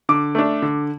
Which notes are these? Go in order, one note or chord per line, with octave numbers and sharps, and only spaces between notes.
D3 D6
A3 D4
D3